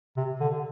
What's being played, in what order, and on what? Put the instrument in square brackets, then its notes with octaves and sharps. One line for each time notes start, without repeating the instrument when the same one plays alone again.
[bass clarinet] C3
D3